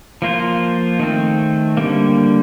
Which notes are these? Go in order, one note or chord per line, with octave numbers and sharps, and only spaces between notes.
F3 A#3 F4 C5
D#3 A3 C4
D3 G3 A#3